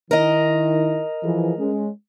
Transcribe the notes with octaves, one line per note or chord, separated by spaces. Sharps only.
D#3 E4 A#4 D#5
E3 F3 G#4
G#3 C#4